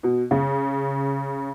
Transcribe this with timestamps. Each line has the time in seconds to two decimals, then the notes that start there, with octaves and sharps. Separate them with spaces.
0.03 B2
0.31 C#3